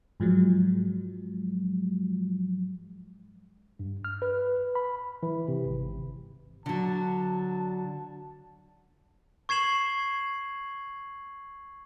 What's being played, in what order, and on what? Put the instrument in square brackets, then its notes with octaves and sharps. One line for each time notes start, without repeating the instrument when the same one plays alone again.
[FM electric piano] G#2 F3 F#3 G#3
[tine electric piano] G2
F6
B4
B5
E3
C3
G#1
[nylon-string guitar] D3 F#3 [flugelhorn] A5
[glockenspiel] C#6 G#6 C7 E7 F#7